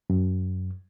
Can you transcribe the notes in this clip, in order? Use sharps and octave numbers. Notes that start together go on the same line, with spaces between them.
F#2